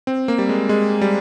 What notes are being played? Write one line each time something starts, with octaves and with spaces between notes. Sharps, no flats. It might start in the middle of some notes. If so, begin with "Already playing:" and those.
C4
A#3
G3
G#3
G#3
G3